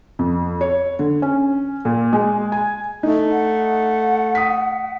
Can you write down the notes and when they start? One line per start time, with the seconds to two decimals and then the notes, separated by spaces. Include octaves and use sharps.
0.19 F2
0.61 C#5
0.99 D3
1.22 C#4
1.85 A#2
2.13 G#3
2.52 G#5
3.03 A3 D#4
3.31 F#5
4.35 D#6 B6